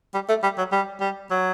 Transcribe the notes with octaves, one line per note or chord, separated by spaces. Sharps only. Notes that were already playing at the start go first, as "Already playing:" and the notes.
G3
A3
G3
F#3
G3
G3
F#3